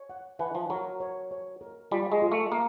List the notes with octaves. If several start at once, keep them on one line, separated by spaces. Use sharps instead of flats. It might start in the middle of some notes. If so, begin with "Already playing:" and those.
Already playing: C#5
F#5
E3 F#5
F3
F#3 A#4
C#5
C#5
A#4
G3 F4
G#3
F4
A3
A#3 A#4